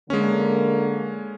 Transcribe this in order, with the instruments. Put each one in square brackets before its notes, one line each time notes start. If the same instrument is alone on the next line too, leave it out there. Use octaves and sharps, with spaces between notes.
[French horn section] D3 A#3 [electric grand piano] G#3 C#4